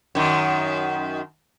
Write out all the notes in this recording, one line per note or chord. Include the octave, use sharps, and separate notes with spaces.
F#2 D#3